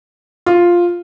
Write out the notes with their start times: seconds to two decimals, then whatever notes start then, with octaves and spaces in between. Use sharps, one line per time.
0.46 F4